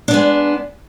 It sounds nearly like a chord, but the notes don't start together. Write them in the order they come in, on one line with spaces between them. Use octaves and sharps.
D4 B3 G#3